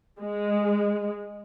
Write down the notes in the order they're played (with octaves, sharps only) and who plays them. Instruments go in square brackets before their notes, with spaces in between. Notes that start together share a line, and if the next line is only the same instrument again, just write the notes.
[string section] G#3